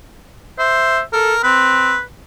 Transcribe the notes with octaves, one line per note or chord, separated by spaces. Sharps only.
C5 E5
A4 A#4
C4 B4